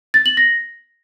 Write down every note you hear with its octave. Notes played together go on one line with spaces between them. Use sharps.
A6
F#7
A#6